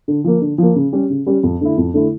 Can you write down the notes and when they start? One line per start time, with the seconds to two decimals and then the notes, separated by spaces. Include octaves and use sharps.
0.08 D3
0.24 F3 A#3
0.41 D3
0.58 F3 A#3
0.76 C#3
0.93 G3 C#4 G4
1.10 C#3
1.26 G3 C#4 G4
1.43 F2
1.61 D3 A3 E4
1.78 F2
1.94 D3 A3 E4